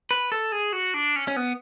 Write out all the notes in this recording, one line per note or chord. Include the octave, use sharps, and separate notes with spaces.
B4
A4
G#4
F#4
D4
C#4
C#4
B3